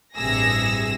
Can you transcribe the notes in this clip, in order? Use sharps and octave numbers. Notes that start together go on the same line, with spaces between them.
A1 G2 C3 G#4 E6 A#6